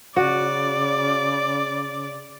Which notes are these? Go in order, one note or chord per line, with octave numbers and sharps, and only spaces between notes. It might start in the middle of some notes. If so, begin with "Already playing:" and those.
C#3 F#4 D5